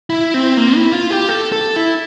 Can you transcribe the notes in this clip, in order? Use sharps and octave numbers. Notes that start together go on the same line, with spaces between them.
E4
C4
A#3
E4
F4
G4
A4
A4
E4